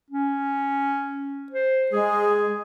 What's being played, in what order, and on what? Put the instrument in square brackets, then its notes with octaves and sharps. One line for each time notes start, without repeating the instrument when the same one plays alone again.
[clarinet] C#4
C5
[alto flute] G#3 [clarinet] G#4